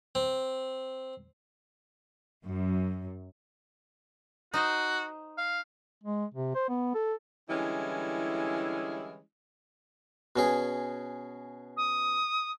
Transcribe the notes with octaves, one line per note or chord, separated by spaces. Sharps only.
C4
F#2
D#4 F#4 C5 D#5
F5
G#3
C3
C5
B3
A4
D3 E3 G3 G#3 C#4 E4
B2 C#4 G#4
D#6